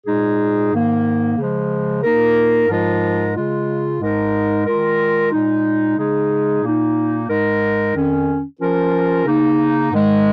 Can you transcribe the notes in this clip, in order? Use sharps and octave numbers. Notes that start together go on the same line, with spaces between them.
A#2 G#3 D#4 G#4
G#2 D#3 A#3
C#3 F3 G#3
A#2 A#3 D#4 A#4
G#2 F3 G#3 F4 A#4
C#3 G#3 F4
G#2 G#3 D#4 A#4
D#3 G#3 F4 A#4
A#2 G#3 D#4
C#3 G#3 D#4 G#4
A#2 A#3 D#4
G#2 G#3 D#4 A#4
F2 D#3 C#4
F3 C#4 F4 A#4
C#3 A#3 D#4
G#2 D#3 G#3